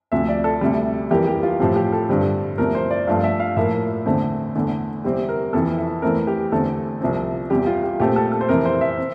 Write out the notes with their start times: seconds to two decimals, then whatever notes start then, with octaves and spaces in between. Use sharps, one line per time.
0.12 D2 C3 F3 E5
0.29 D5
0.44 A4
0.61 D2 C3 G3
1.11 F2 E3 G3 A#3 G4
1.27 G4
1.43 F4
1.60 A2 F3 C4 G4
1.76 G4
1.92 A4
2.09 G2 D3 G3 C4
2.58 E2 C3 F3 A3 A#4
2.75 C5
2.91 D5
3.07 G2 F3 A3 F5
3.24 E5
3.40 F5
3.57 A2 F3 A#3 E5
4.06 E2 D3 A3 C4
4.55 E2 D3 A3
5.04 E2 C3 G3 C4 G4
5.29 A#4
5.53 F2 C3 E3 A4
5.78 E5
6.02 E2 E3 A3 C4 A#4
6.27 G4
6.52 E2 D3 A3 C4 A4
7.01 C2 C3 F3 C4
7.50 E2 C3 G3 G4
7.66 F4
7.83 G4
8.00 A#2 A3 C4 G4
8.16 A4
8.32 A4
8.41 C5
8.49 F2 C3 E3 A#4
8.65 C5
8.81 E5
8.98 C4